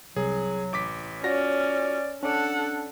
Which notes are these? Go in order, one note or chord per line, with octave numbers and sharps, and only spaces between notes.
C2 F#3 G#4
A1 D6 B6
C#4 F4 F#4 C#5 D5 A#6
C#4 D4 A4 D5 F#5